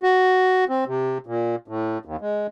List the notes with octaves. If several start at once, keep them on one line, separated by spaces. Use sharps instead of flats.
F#4
C4
C3
A#2
A2
D#2
G#3